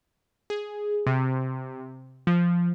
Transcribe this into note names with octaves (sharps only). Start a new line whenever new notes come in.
G#4
C3
F3